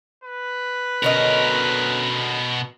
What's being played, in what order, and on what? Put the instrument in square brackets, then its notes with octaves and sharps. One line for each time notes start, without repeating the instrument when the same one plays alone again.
[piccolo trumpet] B4
[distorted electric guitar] B2 A#4 [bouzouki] D3 C#4 D#5